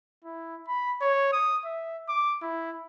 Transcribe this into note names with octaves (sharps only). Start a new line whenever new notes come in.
E4
B5
C#5
D#6
E5
D6
E4